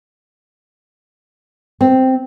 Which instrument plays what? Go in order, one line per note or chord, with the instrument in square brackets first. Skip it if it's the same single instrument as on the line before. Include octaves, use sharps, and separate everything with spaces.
[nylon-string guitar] C4